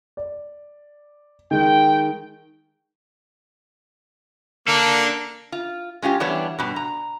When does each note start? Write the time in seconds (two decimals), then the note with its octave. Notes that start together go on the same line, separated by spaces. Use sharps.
0.17 D5
1.51 D#3 G#3 G5
4.68 A#3 D4 A4
5.52 F4
6.02 G#3 C#4 F4 G4
6.20 E3 G3 B3 D4 C#5
6.59 G2 B2
6.76 A#5